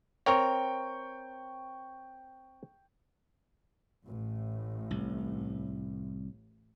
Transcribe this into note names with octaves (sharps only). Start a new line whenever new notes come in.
C4 A#4 C#5 G5 C#6
A1 A2
C2